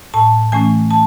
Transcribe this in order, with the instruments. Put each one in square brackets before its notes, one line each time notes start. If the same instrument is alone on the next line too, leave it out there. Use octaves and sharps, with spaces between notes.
[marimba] A2 A5
E3 A3 C#4 G#5
A5